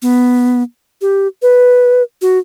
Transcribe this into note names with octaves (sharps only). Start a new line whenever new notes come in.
B3
G4
B4
F#4